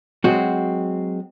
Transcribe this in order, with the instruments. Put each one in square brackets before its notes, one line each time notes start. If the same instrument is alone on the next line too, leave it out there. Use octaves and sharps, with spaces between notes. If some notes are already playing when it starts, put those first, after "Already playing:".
[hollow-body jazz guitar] F#3 G#3 C4 F#4